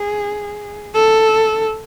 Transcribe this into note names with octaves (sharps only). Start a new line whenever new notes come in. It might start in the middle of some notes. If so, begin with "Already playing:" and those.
Already playing: G#4
A4